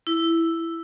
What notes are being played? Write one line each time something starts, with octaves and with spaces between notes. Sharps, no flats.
E4